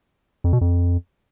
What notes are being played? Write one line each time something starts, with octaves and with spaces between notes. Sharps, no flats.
F2
B2
F2